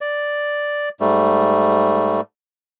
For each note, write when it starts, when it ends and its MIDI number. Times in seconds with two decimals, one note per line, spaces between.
0.01 0.89 74
1.01 2.21 44
1.01 2.21 55
1.01 2.21 57